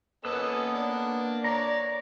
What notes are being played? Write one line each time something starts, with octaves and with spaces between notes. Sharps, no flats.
A#3 B3 C#4 A4 B4 D#5 E6
D4
C#5 D5 A#5